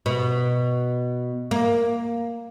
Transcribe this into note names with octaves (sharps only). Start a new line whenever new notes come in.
B2
A#3